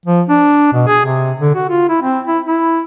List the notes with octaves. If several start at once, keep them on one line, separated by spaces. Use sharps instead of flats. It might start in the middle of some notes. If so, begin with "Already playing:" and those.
F3
D4
B2
G#4
C3
D3
F#4
F4
E4
C4
E4
E4